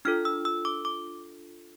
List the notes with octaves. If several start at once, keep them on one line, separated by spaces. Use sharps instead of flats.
D4 F4 A4 F6
E6
E6
D6
D6